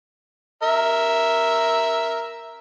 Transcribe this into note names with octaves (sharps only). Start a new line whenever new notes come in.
A#4 E5